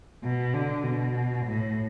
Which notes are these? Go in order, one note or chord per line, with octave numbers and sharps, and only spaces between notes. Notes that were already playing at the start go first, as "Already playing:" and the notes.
B2
D3
B2
A2